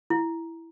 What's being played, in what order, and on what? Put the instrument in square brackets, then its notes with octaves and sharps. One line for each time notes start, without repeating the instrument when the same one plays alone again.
[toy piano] E4